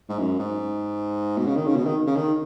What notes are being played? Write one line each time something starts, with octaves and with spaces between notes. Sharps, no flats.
G#2
F#2
G#2
B2
C#3
D#3
C#3
B2
D#3
C#3
D#3